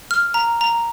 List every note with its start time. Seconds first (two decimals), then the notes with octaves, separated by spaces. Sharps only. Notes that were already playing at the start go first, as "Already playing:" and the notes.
0.11 F6
0.34 A#5
0.61 A#5